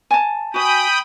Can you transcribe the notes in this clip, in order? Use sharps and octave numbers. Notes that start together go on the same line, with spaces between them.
G#5 A5
F#4 G5 G#5 B5 D#6